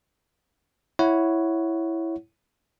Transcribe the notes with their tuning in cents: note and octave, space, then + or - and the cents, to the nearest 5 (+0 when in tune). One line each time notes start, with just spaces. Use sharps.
E4 +0 C#5 +0 F#5 +0